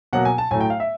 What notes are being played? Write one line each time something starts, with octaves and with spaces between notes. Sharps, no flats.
B2 F#3 A#3 F#5
G#5
A5
A2 F#3 A3 G#5
G5
F5
E5